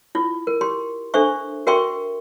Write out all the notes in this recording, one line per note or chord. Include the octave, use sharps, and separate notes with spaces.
E4 F4
A#4
G4 C6
D4 A4 C5 E5 C#6
F#4 A#4 E5 G5 C6 C#6